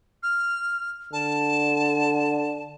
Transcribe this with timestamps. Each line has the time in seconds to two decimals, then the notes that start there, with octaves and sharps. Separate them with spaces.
0.23 F6
1.13 D3 A5